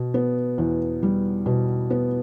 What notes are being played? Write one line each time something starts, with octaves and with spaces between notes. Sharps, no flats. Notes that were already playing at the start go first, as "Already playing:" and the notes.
Already playing: B2
B3
E2
G3
B2
B3